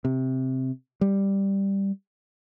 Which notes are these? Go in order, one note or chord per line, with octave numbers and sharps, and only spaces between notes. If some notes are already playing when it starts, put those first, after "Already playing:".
C3
G3